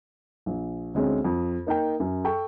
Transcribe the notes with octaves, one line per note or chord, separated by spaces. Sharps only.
A#1
D2 G#3 C4 C#4
F2
A#3 D#4 A#4 G5
F#2
A4 G5 C#6